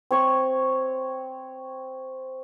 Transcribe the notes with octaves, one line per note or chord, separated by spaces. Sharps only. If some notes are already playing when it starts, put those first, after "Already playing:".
C4 C#5 C#6